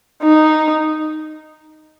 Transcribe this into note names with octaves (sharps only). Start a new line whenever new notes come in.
D#4